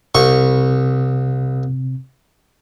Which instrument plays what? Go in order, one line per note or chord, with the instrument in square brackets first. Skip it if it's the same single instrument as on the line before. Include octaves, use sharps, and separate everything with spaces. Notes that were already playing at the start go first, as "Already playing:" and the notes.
[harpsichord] C2 C#6 [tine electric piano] C3 C4